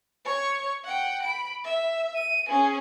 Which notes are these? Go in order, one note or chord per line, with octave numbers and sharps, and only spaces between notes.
C#5 C#6
F#5 G5
B5 D7
E5
D#7
C#4 G#4